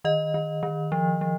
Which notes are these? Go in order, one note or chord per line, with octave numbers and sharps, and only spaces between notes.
D#3 D#5
D#3
D#3
F3
F3